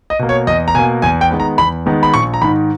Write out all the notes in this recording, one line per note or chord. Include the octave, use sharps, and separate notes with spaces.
D#5
B2 A#3
C#5
E2 D#5
A#5
B2 A#3 G#5
E2 G#5
G5
D#3 G#3 B3
A#5
E2 B5
D#3 G#3 B3
B5
A#1 C#6
A#5
G#2 D#3 B5